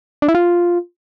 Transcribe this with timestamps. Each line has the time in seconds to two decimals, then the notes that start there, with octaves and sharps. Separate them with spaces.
0.22 D4
0.28 E4
0.35 F4